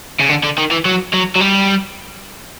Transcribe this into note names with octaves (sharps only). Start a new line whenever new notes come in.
C#3
D3
D3
D#3
E3
F#3
F#3
F#3
G3